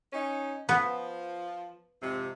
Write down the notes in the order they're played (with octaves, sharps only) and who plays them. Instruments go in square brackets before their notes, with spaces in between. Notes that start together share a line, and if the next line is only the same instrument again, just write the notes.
[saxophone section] C#4 D#4
[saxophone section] F3 [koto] B3
[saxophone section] F2 G#2 C3